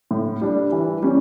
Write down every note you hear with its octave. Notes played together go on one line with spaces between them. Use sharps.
A2
G3 D4
E3
G3 C#4